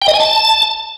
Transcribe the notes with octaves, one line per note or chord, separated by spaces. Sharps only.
G5
D#5
G#5
A5